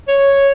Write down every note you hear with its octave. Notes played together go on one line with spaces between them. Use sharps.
C#5